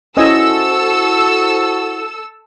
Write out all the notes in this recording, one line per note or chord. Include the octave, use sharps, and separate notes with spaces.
C#4 E4 F#4 A4 C5 D#5 G#5 E6